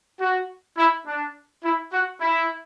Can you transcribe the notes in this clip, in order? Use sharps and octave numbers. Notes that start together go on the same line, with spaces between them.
F#4
E4
D4
E4
F#4
E4